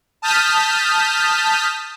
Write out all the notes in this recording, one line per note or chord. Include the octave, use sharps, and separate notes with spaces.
A5 D#6 F6 G6 B6